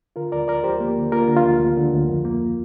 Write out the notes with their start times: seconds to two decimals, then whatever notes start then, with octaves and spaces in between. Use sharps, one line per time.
0.16 D3 F4 A#4
0.32 D2 A#4 D5
0.48 D2 A#4 D5
0.64 D2 G4 C5
0.80 A#3
0.97 D3
1.12 A#3 F4 A#4
1.28 D3
1.37 F4
1.45 D2
1.60 D2
1.77 D3
1.94 D2
2.08 F2
2.25 A#3